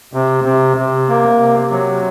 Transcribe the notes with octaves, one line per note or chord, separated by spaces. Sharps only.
C3
C3
C3
A#3
C3
F#3